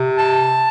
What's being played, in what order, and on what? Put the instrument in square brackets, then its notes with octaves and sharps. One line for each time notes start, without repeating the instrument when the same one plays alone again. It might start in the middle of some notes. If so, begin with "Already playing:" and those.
Already playing: [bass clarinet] C3
[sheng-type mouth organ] A5